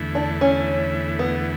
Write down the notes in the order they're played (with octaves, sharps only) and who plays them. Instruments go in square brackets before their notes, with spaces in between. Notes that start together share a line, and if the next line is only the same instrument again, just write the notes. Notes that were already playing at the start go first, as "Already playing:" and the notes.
Already playing: [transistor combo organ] E2 D3 A3 E4
[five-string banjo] D4
C#4
B3